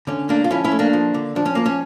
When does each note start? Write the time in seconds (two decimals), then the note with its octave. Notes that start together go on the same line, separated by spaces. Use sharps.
0.07 D3 C#4
0.29 A3 A#3 D4
0.44 F4
0.51 F3 C#4 E4
0.65 C#4 E4
0.72 A3
0.79 A#3 D4
0.93 F3
1.14 D3
1.36 F3 D4
1.46 C#4
1.55 F3 A#3
1.66 C#4